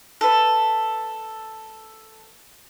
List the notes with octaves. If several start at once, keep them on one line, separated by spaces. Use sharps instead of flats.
A4 B4